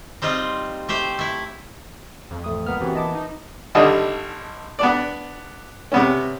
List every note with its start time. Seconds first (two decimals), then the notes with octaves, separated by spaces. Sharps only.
0.22 G3 C4 D#4 F4
0.89 A3 G4 C5 G5
1.19 A3 E4
2.31 F2
2.44 A1 A3 D#6
2.66 C#2 A#3 B3 F6
2.81 E3 C4 F#4 G4
2.95 D#5 A5 D6
3.15 D#4
3.75 G#1 D3 G3 D#5
4.79 B3 D4 D5
5.92 C3 B3 C#4